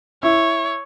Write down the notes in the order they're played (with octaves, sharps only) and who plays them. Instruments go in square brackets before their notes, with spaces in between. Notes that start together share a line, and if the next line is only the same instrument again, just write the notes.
[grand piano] E4 [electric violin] C#5